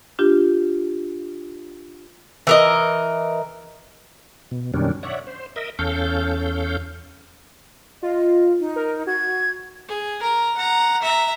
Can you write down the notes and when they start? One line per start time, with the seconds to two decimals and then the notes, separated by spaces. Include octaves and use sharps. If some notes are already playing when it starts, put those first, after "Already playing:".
0.19 D4 F4 G4
2.47 E3 A#4 D#5
4.51 B2
4.74 F#2 B2 D#3 G3 C#4 D4
5.03 C#5 D5 E5 F#5
5.27 C5
5.56 A#4 D#5 E5
5.79 E2 C#4 A4 F5 G6
8.03 F4 D#5
8.60 D#4
8.76 A#4
9.07 F#4 G#6
9.89 G#4
10.20 A#4 A#5
10.57 F#5 A#5
11.02 E5 A#5